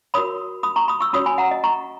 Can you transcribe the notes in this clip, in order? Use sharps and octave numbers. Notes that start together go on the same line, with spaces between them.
F#4 A#4 C#5 B5 D#6
B5 D#6
A#5 C#6
B5 D#6
C#6 E6
C#4 F#4 C#5 B5 D#6
G#5 B5
F#5 A#5
D#5
A#5 C#6